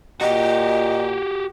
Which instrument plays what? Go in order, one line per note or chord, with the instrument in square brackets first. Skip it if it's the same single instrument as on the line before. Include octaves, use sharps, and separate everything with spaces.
[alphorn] A#2 [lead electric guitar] F#4 G4 [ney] D#5